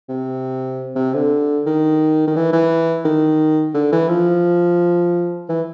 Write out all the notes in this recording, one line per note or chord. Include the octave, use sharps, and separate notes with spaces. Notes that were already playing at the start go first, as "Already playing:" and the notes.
C3
C3
D3
D#3
D#3
E3
E3
D#3
D3
E3
F3
E3